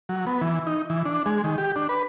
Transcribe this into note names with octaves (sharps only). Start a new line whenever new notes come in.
F#3
B3
E3
D#4
E3
D4
G#3
D#3
G4
D4
B4